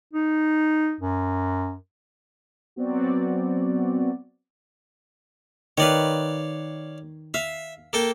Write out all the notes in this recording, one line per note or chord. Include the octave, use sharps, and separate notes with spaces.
D#4
F#2
F#3 B3 C4 F#4 D5
D#3 B4 C#5 D5 F5
E5 F5
A#3 A4 G5